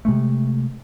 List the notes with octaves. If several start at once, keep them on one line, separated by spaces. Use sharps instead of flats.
C3 G#3 A3